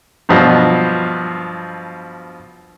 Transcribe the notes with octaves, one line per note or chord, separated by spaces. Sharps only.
G2 B2 F3 F#3